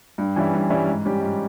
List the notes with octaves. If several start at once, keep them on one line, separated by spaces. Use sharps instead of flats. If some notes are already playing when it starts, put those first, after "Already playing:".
G2
E3 G3 C#4 E4
G2
E3 G3 C#4 E4
G#2
G3 C#4 G4
G#2